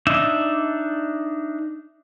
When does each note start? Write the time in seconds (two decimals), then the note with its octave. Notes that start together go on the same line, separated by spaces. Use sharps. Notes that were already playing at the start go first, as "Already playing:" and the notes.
0.07 D4 D#4 E5